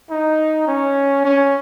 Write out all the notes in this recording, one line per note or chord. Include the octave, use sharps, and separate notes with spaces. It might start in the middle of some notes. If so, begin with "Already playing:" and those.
D#4
C#4
C#4